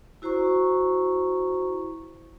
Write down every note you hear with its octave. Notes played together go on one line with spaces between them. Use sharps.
E4 F#4 C5 A#5 C#6